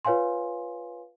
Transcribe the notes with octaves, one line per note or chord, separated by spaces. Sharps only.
F4 B4 C#5 F5 G#5 C6